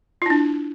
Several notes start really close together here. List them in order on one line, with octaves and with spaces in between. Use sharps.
F4 E4 D4